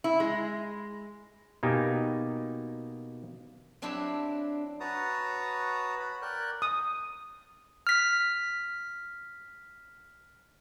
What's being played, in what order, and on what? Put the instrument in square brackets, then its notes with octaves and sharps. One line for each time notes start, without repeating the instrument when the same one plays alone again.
[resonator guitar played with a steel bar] E4
G#3
[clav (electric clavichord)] B2 A#3 D#4 G4 G#5
[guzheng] F#3 C4 D4 E4 G4
[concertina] F#4 B4 C#5 A5 A#5 D#6
B5
A#4 D5 G5 F#6
[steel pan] D#6
[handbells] F6 B6